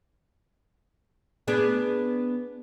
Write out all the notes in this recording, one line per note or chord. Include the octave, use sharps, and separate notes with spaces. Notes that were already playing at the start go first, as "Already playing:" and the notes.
B3 D4 G#4